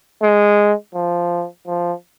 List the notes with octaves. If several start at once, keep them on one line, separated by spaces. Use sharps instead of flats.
G#3
F3
F3